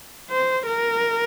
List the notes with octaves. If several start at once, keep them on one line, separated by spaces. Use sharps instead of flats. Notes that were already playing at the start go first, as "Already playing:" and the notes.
C5
A#4